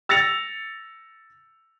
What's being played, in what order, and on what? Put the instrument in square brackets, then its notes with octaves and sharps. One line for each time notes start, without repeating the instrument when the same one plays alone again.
[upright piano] E6 A6 A#6 C#7 F7